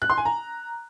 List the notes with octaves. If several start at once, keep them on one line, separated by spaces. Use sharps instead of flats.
F#6
C6
G#5
A#5